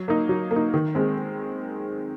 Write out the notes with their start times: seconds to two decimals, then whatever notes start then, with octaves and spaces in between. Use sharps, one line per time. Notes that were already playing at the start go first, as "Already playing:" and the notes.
Already playing: F#3
0.08 A#3 D#4
0.29 F#3
0.51 A#3
0.56 D#4
0.74 D#3
0.95 G#3 C4